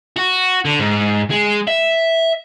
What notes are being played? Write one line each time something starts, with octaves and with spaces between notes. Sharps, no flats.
F#4
D3
G#2
G#3
E5